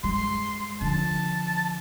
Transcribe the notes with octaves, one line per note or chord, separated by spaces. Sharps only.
G2 G#3 C6
D3 F3 A5